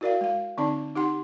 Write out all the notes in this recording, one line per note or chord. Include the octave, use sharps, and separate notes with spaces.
E4 F#4 A#4 D5 E5 F5
G#3 F5
D3 C4 D#4 D5 A5
D#4 G4 F#5 C6